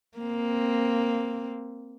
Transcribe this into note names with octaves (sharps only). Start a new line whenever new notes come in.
A#3 C4